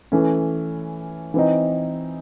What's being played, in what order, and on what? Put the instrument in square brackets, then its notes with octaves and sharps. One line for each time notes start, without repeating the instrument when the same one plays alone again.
[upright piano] E3 A3 C#4
E3 C4 D#4